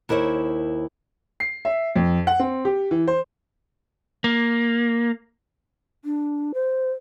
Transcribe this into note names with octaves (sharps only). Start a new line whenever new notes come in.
D#2 E4 A#4 C5 C#5
C7
E5
F2
F#5
C4
G4
E3
C5
A#3
D4
C5